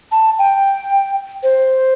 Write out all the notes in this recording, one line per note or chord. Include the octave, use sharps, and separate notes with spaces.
A5
G5
C5